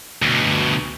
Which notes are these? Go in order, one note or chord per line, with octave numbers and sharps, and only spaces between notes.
D2 B2